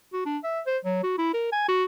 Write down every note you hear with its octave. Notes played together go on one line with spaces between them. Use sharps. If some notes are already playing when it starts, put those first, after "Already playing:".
F#4
D4
E5
C5
F#3
F#4
E4
A#4
G#5
F#4